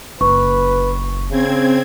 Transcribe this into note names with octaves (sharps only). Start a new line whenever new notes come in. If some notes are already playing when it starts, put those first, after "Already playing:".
F#1 B4 C#6
C#3 C4 G#6